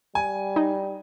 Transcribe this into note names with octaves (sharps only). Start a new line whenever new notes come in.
G3 G#5
D#4